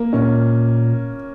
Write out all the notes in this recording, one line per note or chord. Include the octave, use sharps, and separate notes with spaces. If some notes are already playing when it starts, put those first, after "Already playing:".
Already playing: A#3
A#2 C#4